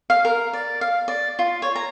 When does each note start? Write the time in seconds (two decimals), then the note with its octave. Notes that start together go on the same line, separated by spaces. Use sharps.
0.10 F5
0.25 A#4
0.53 D5
0.81 F5
1.08 D5
1.39 F4
1.62 C#5
1.76 A#5